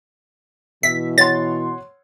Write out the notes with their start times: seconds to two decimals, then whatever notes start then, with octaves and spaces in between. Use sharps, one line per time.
0.83 B2 E3 E5 B6
1.18 C#5 F#5 C6 A6